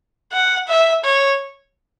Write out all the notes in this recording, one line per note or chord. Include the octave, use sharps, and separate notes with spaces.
F#5
E5
C#5